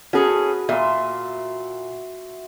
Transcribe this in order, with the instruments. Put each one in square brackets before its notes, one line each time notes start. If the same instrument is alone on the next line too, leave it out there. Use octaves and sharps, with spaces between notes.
[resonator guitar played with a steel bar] C#4 G#4 A4 [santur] F#4 B4
[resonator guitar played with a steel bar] A#2 [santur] E5 C6